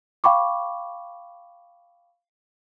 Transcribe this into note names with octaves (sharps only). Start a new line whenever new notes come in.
F5 G5 B5 C#6 D6